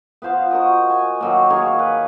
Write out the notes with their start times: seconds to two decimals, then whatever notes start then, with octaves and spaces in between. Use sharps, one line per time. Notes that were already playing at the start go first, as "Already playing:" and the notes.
0.22 B3 F4 C5 F5
0.51 F#4 A#4 D#5
0.90 G#5
1.21 D#3 F#3 A#3
1.50 G#4 A#4 C#5 F5
1.79 B4